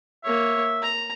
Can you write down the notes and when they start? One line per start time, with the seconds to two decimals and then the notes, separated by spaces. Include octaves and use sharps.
0.24 A#3 C#5 E5
0.82 A#5